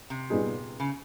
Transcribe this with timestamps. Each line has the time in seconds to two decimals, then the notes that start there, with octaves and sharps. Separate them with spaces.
0.10 C3
0.30 A#2 G3 B3 D#4 G#4
0.80 C#3